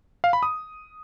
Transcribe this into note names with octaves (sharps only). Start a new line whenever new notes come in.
F5
B5
D#6